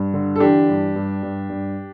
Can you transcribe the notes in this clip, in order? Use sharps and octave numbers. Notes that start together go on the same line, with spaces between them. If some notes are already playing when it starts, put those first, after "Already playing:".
Already playing: G2
D3
A4
E3 D4 G4
G2
G2
G2
G2